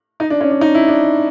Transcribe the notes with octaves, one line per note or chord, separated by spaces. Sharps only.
D#4
D4
C#4
D4
D#4
E4
D4